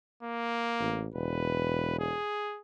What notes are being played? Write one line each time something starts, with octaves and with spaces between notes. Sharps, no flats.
A#3
A1
E1 B4
G#4